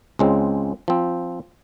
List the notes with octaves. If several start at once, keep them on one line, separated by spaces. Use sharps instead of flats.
C#2 C#3 G#3 C4
F3 C4